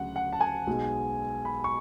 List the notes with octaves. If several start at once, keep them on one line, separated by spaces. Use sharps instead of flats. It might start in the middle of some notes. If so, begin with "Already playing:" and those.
Already playing: D2 C#3 F#3 F#5
F#5
A5
G#5
B1 B2 G#3
B5
C#6